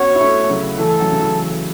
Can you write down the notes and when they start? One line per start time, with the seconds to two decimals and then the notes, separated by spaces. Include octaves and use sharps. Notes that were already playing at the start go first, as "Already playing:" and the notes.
Already playing: B3 C#4 F#4 C#5
0.15 E4
0.20 A3 C#4
0.44 A3
0.50 C#3 F#3
0.78 E3 A3 A4
1.00 C#3 F#3
1.12 C#3
1.22 E3